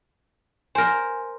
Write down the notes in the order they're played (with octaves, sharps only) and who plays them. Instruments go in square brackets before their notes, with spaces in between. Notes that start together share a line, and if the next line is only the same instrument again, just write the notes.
[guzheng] A#4 C5 [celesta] G#5